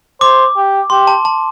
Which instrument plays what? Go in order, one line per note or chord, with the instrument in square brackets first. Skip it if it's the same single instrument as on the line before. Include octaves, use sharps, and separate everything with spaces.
[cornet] C5 [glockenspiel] D6
[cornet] G4
[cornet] G4 [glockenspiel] C6
[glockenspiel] A5
A5